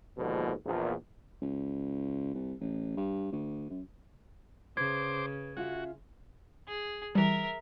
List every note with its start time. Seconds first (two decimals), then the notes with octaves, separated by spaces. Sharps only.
0.17 A#1 D#2 G#2 B2 D3 F3
0.65 A#1 E2
1.42 C#2
2.34 C2
2.60 A1
2.97 G2
3.32 D2
3.70 F#2
4.77 C#3 B4 C5 D6 G#6
5.57 C#4 F4 F#4 E5
6.67 G#4
7.15 E3 G3 A#4 E5